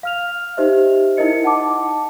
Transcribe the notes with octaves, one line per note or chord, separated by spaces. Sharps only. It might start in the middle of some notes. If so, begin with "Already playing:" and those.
F5 F6 F7
D#4 G4 C5 D#5 E5
D#4 E4 A#4 D#5 C#7
F#5 A5 D6